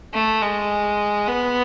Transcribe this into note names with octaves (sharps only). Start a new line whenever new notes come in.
A3
G#3
B3